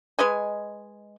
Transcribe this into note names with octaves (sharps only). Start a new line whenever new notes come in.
G#3 B4 D#5 G#5